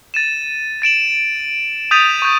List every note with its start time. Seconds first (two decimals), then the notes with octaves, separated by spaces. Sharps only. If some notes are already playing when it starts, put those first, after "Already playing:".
0.14 A6 D#7 E7
0.82 A6 D7 E7 F#7
1.91 D#6 G6 A6 B6 D#7 F7
2.22 C#6 G6